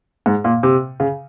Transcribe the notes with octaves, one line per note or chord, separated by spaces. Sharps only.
G#2
A#2
C3
C#3